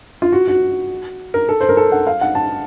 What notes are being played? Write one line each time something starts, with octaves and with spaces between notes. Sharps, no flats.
F4
F#4
F#4
A#4
A4
C5
A#4
A4
F#5
F5
F#5
A5